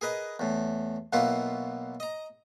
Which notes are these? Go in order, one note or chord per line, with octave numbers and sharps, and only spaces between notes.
G#4 A#4 B4 D#5
E2 A2
B1 B2 A#3 B3 E4 F4
D#5 A#5